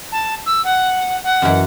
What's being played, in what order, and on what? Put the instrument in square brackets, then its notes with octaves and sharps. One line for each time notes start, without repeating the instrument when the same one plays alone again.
[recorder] A5
E6
F#5
F#5
[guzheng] F#2 E3